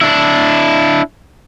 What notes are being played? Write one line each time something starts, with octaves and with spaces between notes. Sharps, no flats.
D4 E4